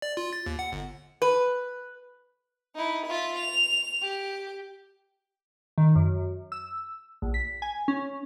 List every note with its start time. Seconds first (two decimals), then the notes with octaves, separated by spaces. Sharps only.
0.02 D5
0.17 F4
0.33 A6
0.46 D#2
0.59 F#5
0.72 G1
1.22 B4
2.75 D#4 E4
3.06 F4 E5
3.38 F7
4.02 G4
5.78 D#3
5.95 F#2
6.52 E6
7.22 A#1
7.34 B6
7.62 G#5
7.88 C#4